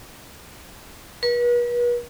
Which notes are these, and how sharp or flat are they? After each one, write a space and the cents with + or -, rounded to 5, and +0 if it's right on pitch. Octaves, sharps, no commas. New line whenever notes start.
B4 -40